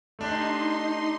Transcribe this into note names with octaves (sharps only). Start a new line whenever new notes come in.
A3 D4 D#4 G4 C6